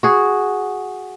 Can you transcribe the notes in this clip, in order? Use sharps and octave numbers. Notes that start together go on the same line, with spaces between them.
F#4 G#4